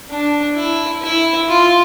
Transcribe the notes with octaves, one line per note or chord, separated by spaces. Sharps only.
D4
E4
E4
F4